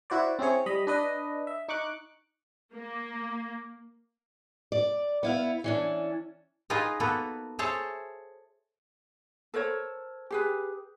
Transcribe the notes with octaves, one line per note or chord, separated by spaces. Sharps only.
E4 F#4 C5 D5
C4 C#4 E4 G#4 C#5
G3 D#5 B5
D4 B4 D#5
E5
D#4 C#6 D6 F#6
A#3
D5
B3 E4 F5
E3 C#4 D4
D#4 F4 G#4 A#4 B4 D#5
A#3 B3 F#4 A4 B4
G#4 A4 C5 C#5 E5 A5
A4 A#4 C5 C#5
G4 G#4 B4